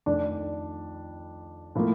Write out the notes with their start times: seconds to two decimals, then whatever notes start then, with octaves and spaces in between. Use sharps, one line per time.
0.06 F2 D#3 A3 D4
1.75 A2 F3 A#3